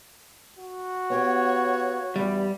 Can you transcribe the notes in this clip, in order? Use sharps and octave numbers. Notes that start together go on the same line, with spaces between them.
F#4
B3 G4 C#5 F5
E2 G2 G3 G4